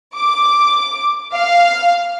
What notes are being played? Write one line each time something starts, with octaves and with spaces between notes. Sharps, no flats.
D6
F5